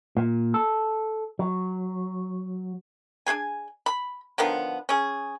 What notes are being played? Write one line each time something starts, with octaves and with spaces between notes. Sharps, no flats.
A#2
A4
F#3
D4 D#4 G#4 G#5
B5
D3 D#3 F3 B3
C#4 G#4